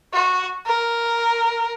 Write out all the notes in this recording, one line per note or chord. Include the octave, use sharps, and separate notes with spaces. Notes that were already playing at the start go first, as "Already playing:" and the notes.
F#4
A#4